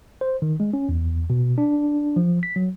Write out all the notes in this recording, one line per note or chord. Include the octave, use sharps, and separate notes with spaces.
C5
D#3
G#3
C#4
E2
B2
D4
F3
B6
F#3